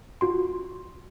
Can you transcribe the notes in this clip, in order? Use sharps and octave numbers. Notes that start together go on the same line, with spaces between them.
F4 F#4 C6